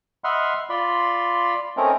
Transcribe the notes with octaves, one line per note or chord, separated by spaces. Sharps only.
D#5 E5 F#5 B5 C6 F6
F4 D5 B5 C6
A3 C4 C#4 D#4 A#4